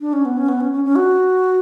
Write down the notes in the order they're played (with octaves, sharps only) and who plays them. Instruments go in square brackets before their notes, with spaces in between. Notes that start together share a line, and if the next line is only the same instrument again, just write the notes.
[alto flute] D4
C#4
B3
C#4
B3
C#4
C#4
C#4
F#4